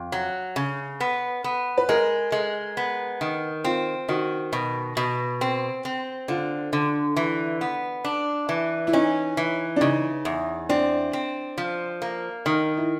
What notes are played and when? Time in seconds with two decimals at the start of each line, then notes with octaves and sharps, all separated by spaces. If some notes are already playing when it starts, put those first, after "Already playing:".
Already playing: F2
0.12 F#3
0.56 C#3
1.00 B3
1.44 B3
1.78 B4
1.89 G#3 A#4
2.32 G#3
2.77 B3
3.21 D#3
3.64 C4 F4
4.09 D#3 F#4
4.53 B2
4.97 B2
5.41 C4
5.85 C4
6.28 D3 F4
6.73 D3
7.17 E3
7.61 B3
8.04 D4
8.49 E3
8.87 E4
8.93 C#4 D#4
9.37 E3
9.76 D4
9.81 C#3 D#4
10.25 E2
10.69 C4 D4
11.13 C4
11.58 F3
12.02 A#3
12.45 D#3 D#4
12.77 E4